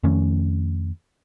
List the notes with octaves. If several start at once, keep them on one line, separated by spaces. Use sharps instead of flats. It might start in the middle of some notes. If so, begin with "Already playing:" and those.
F2 D#3 A3 C#4